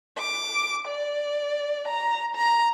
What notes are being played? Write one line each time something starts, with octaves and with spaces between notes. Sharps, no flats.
D6
D5
A#5
A#5